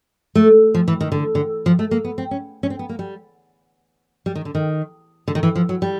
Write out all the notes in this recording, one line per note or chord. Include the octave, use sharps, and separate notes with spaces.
A3
F3
E3
D#3
D3
D3
F3
A3
A#3
B3
C4
C#4
C#4
C4
B3
A#3
G3
G3
D#3
D3
D#3
D3
D#3
E3
F3
F#3
G3